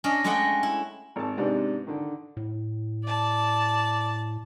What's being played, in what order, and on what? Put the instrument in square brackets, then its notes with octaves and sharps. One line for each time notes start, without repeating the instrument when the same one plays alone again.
[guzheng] C#4 D4 D#5
G#3 A3 A4 D#5 F#5 G5
E4
[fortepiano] G#1 A5
G#2 C3 B3 D4
D3 D#3
[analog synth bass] A2
[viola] D5 [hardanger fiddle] A5